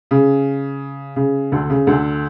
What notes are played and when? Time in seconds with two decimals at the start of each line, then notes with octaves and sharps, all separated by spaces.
0.11 C#3
1.16 C#3
1.52 D2 D3
1.70 C#3
1.87 D2 D3